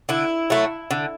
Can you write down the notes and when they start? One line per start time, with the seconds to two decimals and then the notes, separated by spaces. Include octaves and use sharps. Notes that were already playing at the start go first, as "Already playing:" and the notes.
0.09 D3 E4
0.50 F#3 A3
0.91 D3